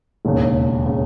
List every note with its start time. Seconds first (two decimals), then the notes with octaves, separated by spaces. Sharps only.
0.25 E1 D#2 C#3
0.86 C#3